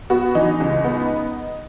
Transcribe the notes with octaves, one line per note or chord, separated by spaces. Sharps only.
B3 F#4
E3 D#4
C#2
B3